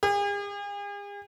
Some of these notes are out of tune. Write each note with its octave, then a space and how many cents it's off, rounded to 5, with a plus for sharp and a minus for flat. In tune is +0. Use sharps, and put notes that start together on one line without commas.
G#4 -45